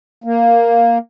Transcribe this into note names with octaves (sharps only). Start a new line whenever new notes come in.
A#3